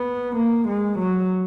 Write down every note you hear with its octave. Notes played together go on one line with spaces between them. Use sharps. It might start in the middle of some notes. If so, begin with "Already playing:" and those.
Already playing: B3
A#3
G#3
F#3